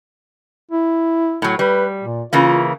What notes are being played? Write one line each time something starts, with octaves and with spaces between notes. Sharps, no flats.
E4
A2 F#3
G3 B4
A#2
C#3 E3 A#3 F4